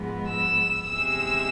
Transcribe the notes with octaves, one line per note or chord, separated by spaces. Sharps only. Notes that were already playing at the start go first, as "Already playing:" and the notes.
Already playing: G#2 F3 G#3 B3
E6
E2 C3 G#3 E6